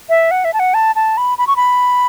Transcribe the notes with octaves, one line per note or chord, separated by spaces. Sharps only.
E5
F#5
E5
A5
F#5
A5
A5
B5
B5
C#6
B5